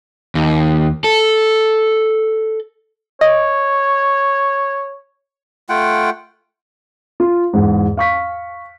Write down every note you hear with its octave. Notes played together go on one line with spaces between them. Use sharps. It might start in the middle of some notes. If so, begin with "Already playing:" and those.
D#2
A4
C#5 D#5
A3 F4 F#5 G5
F4
E2 G#2
F5 C#6 B6